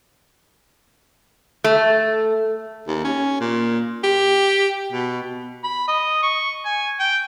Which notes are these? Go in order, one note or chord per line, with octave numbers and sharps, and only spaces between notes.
A3
D#2
C#4
A#2
G4
B2
B5
D#5
C#6
G#5
G5